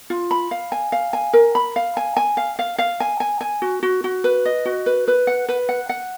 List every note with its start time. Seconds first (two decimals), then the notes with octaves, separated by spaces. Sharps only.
0.10 F4
0.31 B5
0.51 F5
0.72 G#5
0.92 F5
1.13 G#5
1.33 A#4
1.55 B5
1.76 F5
1.97 G#5
2.17 G#5
2.37 F5
2.59 F5
2.78 F5
3.00 G#5
3.20 G#5
3.41 G#5
3.62 F#4
3.83 F#4
4.04 F#4
4.24 B4
4.45 D#5
4.65 F#4
4.86 B4
5.08 B4
5.27 F#5
5.49 B4
5.69 F#5
5.89 F#5